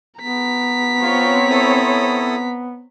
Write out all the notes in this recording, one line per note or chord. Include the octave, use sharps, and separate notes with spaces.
B3 A#5 B6
C4 F4 C#5
E4 A4 D#6